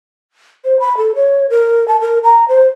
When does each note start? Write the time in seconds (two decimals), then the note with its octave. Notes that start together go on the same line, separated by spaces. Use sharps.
0.65 C5
0.80 B5
0.97 A4
1.15 C#5
1.50 A#4
1.88 A5
2.01 A#4
2.24 A#5
2.48 C5